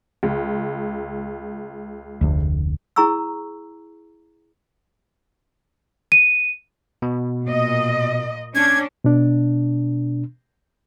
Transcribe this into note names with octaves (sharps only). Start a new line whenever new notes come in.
C#2
F1 D2
E4 G#4 A#5 C#6 E6
D#7
B2
A#2 D#5
C#4 D4 G#6
B2 D4